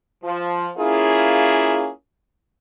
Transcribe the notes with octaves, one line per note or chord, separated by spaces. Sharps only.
F3
A#3 C#4 E4 F4 G#4